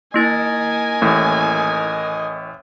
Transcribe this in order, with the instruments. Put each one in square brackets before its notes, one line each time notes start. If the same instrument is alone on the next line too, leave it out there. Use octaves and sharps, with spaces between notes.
[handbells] A#3 E4 A6 [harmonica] A#4 D#5 [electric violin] G#5
[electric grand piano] A1 A2